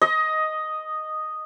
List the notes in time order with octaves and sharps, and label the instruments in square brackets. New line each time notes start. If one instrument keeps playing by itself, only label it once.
[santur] D#5